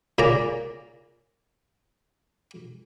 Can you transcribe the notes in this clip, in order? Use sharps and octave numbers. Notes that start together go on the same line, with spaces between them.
A#2 C#3 D5 A#5